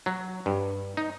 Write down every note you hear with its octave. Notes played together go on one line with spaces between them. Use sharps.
F#3
G2
D#4